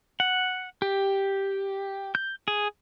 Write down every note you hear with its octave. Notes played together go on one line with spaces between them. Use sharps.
F#5
G4
G6
G#4